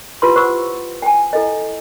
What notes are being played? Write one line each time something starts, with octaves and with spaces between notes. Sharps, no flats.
E4 F4 G4 B4 F#5 C6
C5 F#5 C#6 E6
G5 G#5
E4 A4 D#5